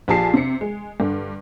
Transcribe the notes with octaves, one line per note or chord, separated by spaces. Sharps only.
A#1 F3 G4 G#4 A5 C7
C3 C4 C#7
G#3
G2 D3